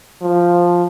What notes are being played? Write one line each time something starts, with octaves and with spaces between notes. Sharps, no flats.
F3